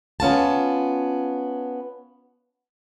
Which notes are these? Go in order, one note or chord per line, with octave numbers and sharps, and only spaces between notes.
B3 C#4 F4 A5